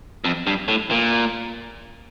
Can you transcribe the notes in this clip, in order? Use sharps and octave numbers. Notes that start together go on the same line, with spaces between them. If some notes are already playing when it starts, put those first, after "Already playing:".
F2
G2
A2
A#2